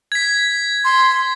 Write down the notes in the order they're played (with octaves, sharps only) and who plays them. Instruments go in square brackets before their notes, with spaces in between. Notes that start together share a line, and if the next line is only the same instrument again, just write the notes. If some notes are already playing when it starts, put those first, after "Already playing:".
[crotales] G#6 B6
[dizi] C6